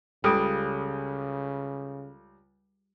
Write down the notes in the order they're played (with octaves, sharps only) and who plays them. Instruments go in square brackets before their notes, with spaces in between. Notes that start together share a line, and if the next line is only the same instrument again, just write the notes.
[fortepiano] C#2 [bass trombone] C#3 [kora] G3 [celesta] A4 D#6 D7